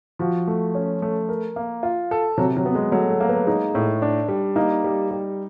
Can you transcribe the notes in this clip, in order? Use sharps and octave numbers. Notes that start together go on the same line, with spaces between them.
F3 F#4
A3
C#4
A3
A#4
A#3
F4
A4
C3 F#3
F#3
B3
G#3
F#3 A3
A3
A#3
B3
G#3 D#4
A2
D4
G3
A#3 D#4
G3
G3